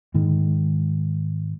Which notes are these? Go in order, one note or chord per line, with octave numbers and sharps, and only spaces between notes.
G#2 D#3 G#3